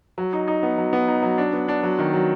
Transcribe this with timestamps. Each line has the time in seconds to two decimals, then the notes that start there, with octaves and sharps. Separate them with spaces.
0.18 F#3
0.33 D#4
0.48 D#4
0.63 B3
0.78 F#3
0.93 B3
1.08 D#4
1.23 F#3
1.38 D4
1.53 B3
1.68 D4
1.83 F#3
1.99 D#3
2.14 F#3